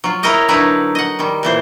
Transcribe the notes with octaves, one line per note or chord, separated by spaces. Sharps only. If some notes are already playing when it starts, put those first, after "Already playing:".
F#3 F4
E4 A#4 C#5 D#5 G5
D3 F#3 D#4 E4 A#4 B4
D#5 F#5
D#3 G3
A#2 E3 C5